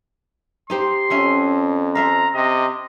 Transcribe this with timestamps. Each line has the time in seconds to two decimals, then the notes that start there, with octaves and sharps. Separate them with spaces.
0.70 D#4 G4 C5 C6
1.10 F2 C#4 E5 F#5
1.95 C5 E5 F5 A#5
2.35 C3 D#5